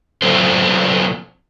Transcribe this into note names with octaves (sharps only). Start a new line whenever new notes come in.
B2 F#3 C4 F4 A4 C5